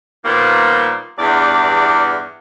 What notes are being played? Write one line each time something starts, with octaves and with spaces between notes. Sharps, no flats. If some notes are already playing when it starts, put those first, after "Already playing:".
A#2 D#3 F3 G3 A#3 B3
E2 G2 D5